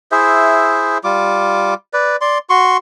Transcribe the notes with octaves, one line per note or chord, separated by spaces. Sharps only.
E4 G#4 C5 E5
G3 F4 D6
B4 D5
D5 C6
F#4 C6 C#6